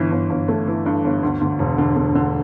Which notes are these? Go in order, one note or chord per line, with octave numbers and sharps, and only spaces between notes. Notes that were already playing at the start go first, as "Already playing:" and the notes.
Already playing: G1 E3
G1
G1
A3
E3
G2
G1
D2
D2
E1
D3
D3
D3